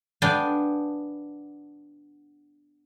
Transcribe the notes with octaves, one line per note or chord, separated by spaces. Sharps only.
B3 D4 F5 G5 G#5